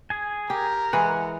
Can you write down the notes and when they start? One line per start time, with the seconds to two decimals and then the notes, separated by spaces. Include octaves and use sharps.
0.10 G#4 G#5
0.50 G4 A#4
0.93 E3 G#3 G#4 F#5